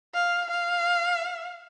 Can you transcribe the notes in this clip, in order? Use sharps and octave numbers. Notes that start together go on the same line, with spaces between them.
F5
F5